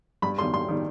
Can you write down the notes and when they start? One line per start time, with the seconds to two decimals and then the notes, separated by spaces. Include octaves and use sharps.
0.22 G2 B5
0.38 G3 C6
0.42 D#3
0.53 G2 C6
0.68 D#3 G3